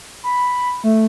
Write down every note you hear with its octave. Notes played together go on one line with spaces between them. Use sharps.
B5
A3